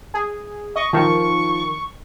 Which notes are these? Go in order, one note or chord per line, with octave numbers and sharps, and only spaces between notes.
G#4
D#5 C#6
D#3 F3 C#6